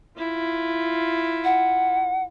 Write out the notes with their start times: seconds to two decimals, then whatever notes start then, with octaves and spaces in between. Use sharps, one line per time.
0.18 E4 F4
1.44 F#5